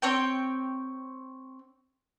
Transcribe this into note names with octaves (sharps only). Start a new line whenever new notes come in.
C4 C#5 G5